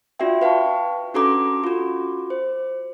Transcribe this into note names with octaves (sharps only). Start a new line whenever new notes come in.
D4 F4 F#4 D5 E5 G5
B4 F5 G5 A5 C#6
C#4 D4 F#4 A4 A#5 D6
F4 F#4
C5